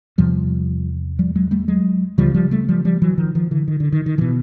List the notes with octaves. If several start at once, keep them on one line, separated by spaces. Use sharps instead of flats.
E2 C3 F3 G3
F3 G3
F#3 G#3
G3 A3
F#3 G#3
D2 C#3 F3 G3
F3 G3
G3 A3
F3 G3
F3 G3
E3 F#3
D#3 F3
D#3 F3
D3 E3
D#3
D3
D#3
D#3
B2 D3 E3